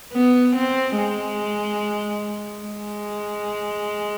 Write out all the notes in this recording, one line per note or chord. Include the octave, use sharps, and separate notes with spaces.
B3
C4
G#3
G#3